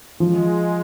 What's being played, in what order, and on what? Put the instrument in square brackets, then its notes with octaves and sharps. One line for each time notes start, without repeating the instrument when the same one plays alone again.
[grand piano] F3 [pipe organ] G#3